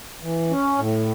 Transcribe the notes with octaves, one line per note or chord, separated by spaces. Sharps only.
E3
C#4
A2